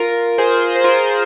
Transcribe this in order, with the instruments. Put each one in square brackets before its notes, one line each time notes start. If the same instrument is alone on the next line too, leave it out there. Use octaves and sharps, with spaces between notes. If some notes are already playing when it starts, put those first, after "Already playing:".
Already playing: [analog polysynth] F4 A#4
G#4 C5
C5
F4 A#4